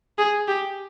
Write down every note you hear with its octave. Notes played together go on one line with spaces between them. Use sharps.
G#4
G4